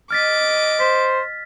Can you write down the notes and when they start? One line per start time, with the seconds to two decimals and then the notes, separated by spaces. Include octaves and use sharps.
0.11 D#5 D6 F6 A6 B6
0.80 C5 B6